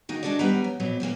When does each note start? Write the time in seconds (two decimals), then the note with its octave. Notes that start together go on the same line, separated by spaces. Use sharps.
0.09 D#3 A#3 D#4 F#4
0.23 G#3 D4 F#4 A4 A#4 D5
0.39 D#2 G3 B3 B4 A#5
0.64 F#3
0.80 F2 A#2 F#3 B3
1.00 G2 E3 A#3 B3